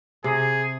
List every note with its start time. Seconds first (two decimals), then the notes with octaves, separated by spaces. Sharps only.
0.24 C3 G#4